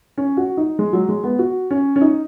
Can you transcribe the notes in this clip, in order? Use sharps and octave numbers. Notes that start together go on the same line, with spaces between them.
C#4
F#4
D#4
G#3
F#3
G#3
B3
F#4
C#4
C#4
D#4